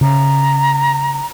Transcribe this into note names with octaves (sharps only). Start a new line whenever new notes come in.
C#3 A#5